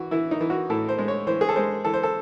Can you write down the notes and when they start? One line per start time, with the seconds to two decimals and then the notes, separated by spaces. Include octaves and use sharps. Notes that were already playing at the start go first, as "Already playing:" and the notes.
Already playing: E3 F#4
0.11 E3 E4
0.31 D#4
0.41 E3
0.50 F#4
0.70 A2 A4
0.89 C5
0.98 G#3
1.08 C#5
1.27 E3 C5
1.41 G#4
1.49 A4
1.56 G#3 C5
1.85 E3 A4
1.94 C5
2.03 A4